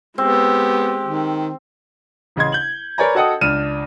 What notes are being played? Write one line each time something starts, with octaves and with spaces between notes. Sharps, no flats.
G#3 B3 C4 G4
D#3
A1 C#3 D#5 C6 G#6
G6 F#7
A#4 B4 C#5 D5 G#5 A#5
F#4 A4 D#5 F#5 G5 D#6
C#2 D4 F6 D#7 E7